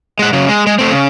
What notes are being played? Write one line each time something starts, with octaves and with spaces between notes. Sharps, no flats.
G#3 F#5
C#3 F#3
G#3
G#3
A3 C4
C#3